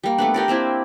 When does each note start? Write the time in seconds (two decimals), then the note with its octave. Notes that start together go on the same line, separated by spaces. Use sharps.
0.03 G3 A#3
0.18 A3 B3 D4
0.34 G4 A#4 D5
0.48 A#3 C4 D4 E4